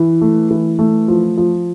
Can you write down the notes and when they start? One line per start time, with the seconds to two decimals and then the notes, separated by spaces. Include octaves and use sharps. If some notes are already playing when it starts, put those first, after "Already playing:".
Already playing: E3
0.21 A3
0.51 E3
0.79 A3
1.08 F3
1.37 F3